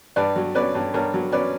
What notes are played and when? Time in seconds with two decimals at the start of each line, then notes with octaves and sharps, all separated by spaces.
0.16 G2 B4 D5
0.36 F#3
0.55 C#4 B4 D5
0.75 G2
0.94 G2 A#4 C#5
1.14 F#3
1.32 C#4 B4 D5